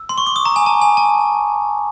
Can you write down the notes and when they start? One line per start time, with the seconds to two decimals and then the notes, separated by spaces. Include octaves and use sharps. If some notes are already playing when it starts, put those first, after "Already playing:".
Already playing: E6
0.09 C6
0.18 C#6
0.27 D6
0.36 D#6
0.45 A#5
0.56 G#5
0.66 A5
0.81 G#5
0.97 A5